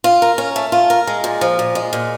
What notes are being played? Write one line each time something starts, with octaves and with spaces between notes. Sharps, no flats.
F4
A#4
C#4
A3
F4
A#4
G#3
A#2
F3
A#2
G#3
A#2